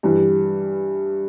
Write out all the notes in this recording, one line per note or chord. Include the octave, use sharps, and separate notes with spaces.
G2 E3 G3